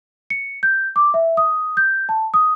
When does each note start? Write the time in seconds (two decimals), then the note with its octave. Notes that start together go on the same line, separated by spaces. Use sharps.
0.30 C#7
0.63 G6
0.96 D6
1.14 E5
1.37 D#6
1.77 G6
2.09 A5
2.34 D#6